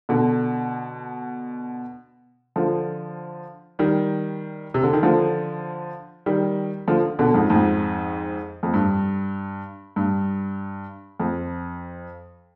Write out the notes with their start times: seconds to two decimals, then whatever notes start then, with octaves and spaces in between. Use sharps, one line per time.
0.09 B2 D3
2.56 D3 F3
3.79 D#3 G3
4.74 C3
4.83 D3
4.93 D#3
5.03 D3 F3
6.26 D#3 G3
6.88 D3 F3
7.19 B2 D3
7.34 F2 G#2
7.50 F2 G#2
8.63 F2
8.74 G2
9.96 G2
11.20 F2